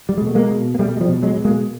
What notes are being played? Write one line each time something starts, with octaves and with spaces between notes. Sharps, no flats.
G3
G#3
B2
A3
G#3 A#3
B2
A#3
B2 G3 A3
G#3
F3 G3
B2
F#3 G#3
B2
G#3 A#3